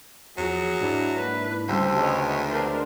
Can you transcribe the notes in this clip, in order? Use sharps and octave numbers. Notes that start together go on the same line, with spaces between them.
E2 F3 F#3 G#4
G#2 D4 E4
A#3 B4
D2 C#3 G3 C4 A4 C5
G#3 B3 C#5 D#5
D4 A#4 C5 D5 C6